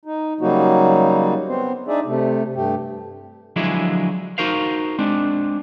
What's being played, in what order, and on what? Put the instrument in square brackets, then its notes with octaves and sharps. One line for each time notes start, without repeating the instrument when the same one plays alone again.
[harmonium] D#4
C#3 F#3 G3 A#3 D#4 F#4
B3 C4 C5
D4 D#4 G#4 D5 E5
C3 A3
G2 A3 G4
[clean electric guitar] D3 F3 F#3 G#3 E4 G#4
D#4 F#4 A#4 C5 F5
G#3 C4 D4